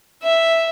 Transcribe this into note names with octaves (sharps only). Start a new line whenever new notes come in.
E5